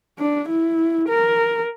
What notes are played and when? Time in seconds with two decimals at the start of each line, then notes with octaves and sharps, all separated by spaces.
0.19 D4
0.49 E4
1.09 A#4